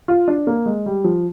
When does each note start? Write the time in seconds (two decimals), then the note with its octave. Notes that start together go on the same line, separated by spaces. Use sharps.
0.08 F4
0.28 D4
0.47 A#3
0.66 G#3
0.86 G3
1.04 F3